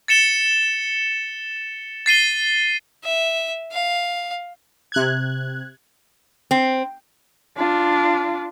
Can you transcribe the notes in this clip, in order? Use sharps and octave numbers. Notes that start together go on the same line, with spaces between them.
A6 C#7 E7 G7
A6 C7 D#7 G7
E5
F5
C3 F#6 G#6
C4
D4 F4